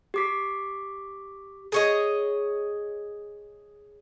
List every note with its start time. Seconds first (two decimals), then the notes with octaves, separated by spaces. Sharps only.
0.14 G4 D6 B6
1.72 G#4 C#5 D#5